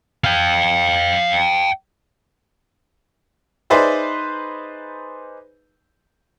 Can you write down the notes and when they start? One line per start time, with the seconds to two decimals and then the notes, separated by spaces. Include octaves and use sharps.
0.24 F5 G5
3.70 D#4 G#4 B4 C5 D5 E5